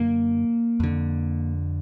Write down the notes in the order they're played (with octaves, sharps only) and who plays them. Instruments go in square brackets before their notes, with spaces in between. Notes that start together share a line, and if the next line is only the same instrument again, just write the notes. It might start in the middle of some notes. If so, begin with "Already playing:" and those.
Already playing: [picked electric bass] F#2 D3 A#3
F2 D3